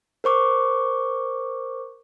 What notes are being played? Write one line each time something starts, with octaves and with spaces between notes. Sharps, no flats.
A#4 C5 C#6 D6